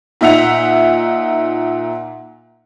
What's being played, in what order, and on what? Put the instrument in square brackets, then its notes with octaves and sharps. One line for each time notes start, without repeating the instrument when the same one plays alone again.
[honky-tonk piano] A#2 D#4 E5 F#5 F7